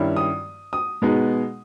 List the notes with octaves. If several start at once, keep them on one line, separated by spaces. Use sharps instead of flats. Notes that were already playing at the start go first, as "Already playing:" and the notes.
Already playing: G2 D#3 G3 C#4 E4
D#6
D#6
B2 G#3 B3 D#4